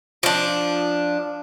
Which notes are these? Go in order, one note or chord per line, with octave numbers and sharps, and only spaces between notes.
F3 D4